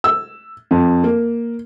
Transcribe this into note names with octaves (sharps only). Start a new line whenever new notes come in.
E6
F2
A#3